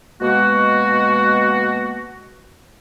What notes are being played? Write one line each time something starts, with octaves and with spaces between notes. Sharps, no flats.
B2 G#3 A#3 F#4